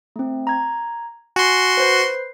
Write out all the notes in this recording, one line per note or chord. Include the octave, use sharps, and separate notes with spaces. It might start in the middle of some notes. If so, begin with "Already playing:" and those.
A3 C4
A#5 G#6
F#4 G#5 C6
B4 C5 C7